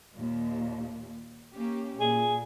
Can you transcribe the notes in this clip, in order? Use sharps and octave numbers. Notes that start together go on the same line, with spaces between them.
D#2 A#2
A#3 C#4 G4
A#2 G#4